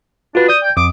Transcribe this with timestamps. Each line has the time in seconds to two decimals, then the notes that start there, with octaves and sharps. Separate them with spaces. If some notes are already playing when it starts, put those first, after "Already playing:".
0.35 D4 F4 F#4 B4
0.49 D5 D#6 G6
0.63 G5
0.77 F2 D6 D#6